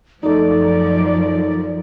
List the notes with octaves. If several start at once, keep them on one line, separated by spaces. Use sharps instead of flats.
F#2 F3 A3 D#4 D5